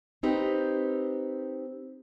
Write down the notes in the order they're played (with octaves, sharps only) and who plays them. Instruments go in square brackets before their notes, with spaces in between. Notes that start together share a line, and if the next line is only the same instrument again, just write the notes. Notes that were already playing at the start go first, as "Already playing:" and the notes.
[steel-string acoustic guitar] C4 D#4 G4 B4